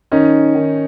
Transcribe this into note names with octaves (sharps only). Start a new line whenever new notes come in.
D#3 C#4 D#4
D#3